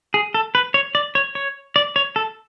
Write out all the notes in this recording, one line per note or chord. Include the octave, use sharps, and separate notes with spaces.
G#4
A4
B4
C#5
D5
C#5
C#5
D5
C#5
A4